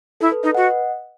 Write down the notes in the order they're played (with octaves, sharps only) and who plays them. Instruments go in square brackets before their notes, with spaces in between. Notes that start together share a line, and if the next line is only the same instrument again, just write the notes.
[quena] E4 [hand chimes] A4
[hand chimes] B4
[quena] D#4 [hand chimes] B4 D#5
[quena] F#4 [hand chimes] D#5 F#5